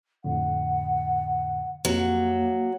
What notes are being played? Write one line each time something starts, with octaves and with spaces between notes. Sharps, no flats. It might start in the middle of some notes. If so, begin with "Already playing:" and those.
F2 A2 D3 F#5
F2 F#3 A#3